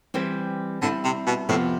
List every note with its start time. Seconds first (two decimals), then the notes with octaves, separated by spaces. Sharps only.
0.14 E3 G3 C4 G4 C5
0.81 D3 G3 C4 E4
1.04 C3
1.27 B2
1.49 F2 A2 C3 F3 B3